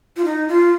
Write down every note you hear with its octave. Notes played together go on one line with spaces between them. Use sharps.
F4
D#4
F4